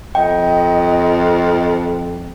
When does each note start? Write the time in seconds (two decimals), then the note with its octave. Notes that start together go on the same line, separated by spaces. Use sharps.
0.15 F2 D#5 G5